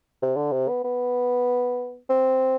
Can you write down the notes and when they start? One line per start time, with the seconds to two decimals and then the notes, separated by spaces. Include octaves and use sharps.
0.22 C3
0.37 D3
0.52 C3
0.69 B3
0.84 B3
2.10 C4